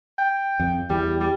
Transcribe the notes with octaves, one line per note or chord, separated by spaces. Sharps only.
G5
F2
E2 G3
G3